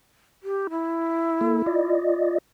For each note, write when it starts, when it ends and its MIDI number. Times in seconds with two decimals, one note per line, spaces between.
0.43 0.68 67
0.70 1.94 64
1.41 1.62 58
1.41 1.62 69
1.66 2.38 65
1.66 2.38 74
1.66 2.38 75